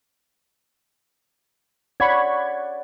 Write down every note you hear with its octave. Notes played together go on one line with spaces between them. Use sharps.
C#5 D5 F#5 B5 C#6 G#6